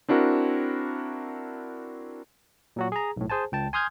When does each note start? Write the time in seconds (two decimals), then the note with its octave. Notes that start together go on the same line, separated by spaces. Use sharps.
0.08 C4 D4 E4 F#4 A#4
2.76 A#2 F#3 F#4
2.92 G#4 A#5
3.17 B1 A2
3.30 G#4 C5 G#5 A5
3.52 C#2 G5 A5
3.73 G#5 C6 D#6 F6 G6 G#6